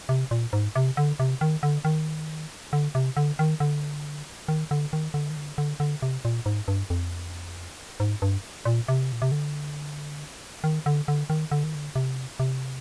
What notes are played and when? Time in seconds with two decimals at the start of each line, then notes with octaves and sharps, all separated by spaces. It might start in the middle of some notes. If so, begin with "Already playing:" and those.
0.09 C3
0.31 A#2
0.53 G#2
0.76 C3
0.97 D3
1.20 C3
1.41 D#3
1.63 D3
1.85 D#3
2.73 D3
2.95 C3
3.17 D3
3.39 D#3
3.60 D3
4.48 D#3
4.71 D3
4.93 D#3
5.14 D3
5.30 D#3
5.36 D3
5.58 D3
5.80 D3
6.02 C3
6.25 A#2
6.46 G#2
6.68 G2
6.90 F2
8.00 G#2
8.22 G2
8.65 A#2
8.88 C3
9.12 A#2
9.22 C3
9.32 D3
10.64 D#3
10.86 D3
11.08 D3
11.30 D#3
11.51 D3
11.64 D#3
11.75 D3
11.96 C3
12.40 C3